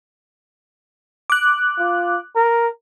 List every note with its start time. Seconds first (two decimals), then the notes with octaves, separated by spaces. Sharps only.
1.30 D6 F#6
1.78 F4
2.36 A#4